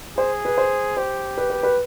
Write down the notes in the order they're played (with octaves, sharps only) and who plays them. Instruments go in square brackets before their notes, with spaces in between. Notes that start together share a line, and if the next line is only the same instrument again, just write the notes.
[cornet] G#4 [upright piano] C5
[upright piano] B4
C5
[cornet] G4 [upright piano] C5
[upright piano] B4
B4
B4